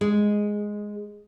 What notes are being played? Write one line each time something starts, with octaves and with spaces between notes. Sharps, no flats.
G#3